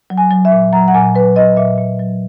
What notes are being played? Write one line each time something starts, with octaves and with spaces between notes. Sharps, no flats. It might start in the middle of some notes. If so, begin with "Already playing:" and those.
F#3
G#5
F#3
E5
A#2
F#3 A#5
F#5
A#2 G#5
F#3 B4
F#3 D#5
A#2 E5
A#2
F#3